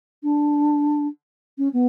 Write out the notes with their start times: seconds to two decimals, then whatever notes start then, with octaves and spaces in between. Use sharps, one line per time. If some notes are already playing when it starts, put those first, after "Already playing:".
0.23 D4
1.57 C#4
1.73 B3